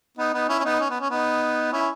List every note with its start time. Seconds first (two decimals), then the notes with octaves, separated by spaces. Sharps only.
0.18 B3 D#4
0.34 B3 D#4
0.49 C#4 E4
0.60 C#4
0.64 B3 D#4
0.80 C#4
0.90 B3
1.01 C#4
1.10 B3 D#4
1.72 C#4 E4